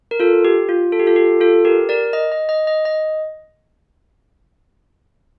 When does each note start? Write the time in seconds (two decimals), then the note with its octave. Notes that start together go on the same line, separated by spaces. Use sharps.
0.11 A#4
0.20 F4 A4
0.45 G4
0.69 F4
0.92 A4
0.99 G4
1.07 F4 A4
1.16 G4
1.41 F4 A4
1.65 G4 A#4
1.89 A#4 D5
2.13 D#5
2.32 D#5
2.49 D#5
2.67 D#5
2.85 D#5